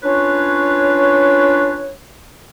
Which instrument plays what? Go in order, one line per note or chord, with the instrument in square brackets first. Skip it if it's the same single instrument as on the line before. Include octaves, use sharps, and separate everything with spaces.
[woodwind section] C#4 D4 F4 B4 C#5